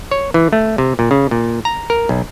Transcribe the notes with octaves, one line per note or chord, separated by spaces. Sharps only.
C#5
E3
A3
C3
A#2
C#3
A#2
A#5
A#4
B1